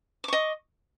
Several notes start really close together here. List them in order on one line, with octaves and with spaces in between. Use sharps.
D6 C#6 D#5